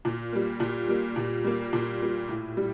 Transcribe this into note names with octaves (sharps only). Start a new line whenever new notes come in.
A#2
G3 A#3
A#2
G3 A#3
A#2
G3 A#3
A#2
G3 A#3
A2
G3